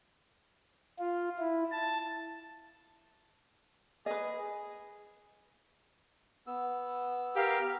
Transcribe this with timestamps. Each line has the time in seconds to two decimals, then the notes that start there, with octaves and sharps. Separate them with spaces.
0.99 F4
1.39 E4
1.72 A5
4.06 G#4 B4 D#5
6.47 B3 E6
7.36 G4 A#4 F5